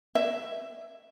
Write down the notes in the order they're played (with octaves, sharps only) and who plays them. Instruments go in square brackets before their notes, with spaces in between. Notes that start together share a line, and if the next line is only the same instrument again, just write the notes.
[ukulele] E5